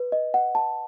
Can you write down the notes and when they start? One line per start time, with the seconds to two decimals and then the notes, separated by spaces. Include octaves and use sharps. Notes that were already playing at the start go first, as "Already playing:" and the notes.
Already playing: B4
0.12 D#5
0.34 F#5
0.55 A5